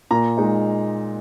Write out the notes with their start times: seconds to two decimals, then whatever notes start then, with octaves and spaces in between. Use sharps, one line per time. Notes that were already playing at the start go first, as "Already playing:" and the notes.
0.11 A#2 A#5
0.37 G#3 D#4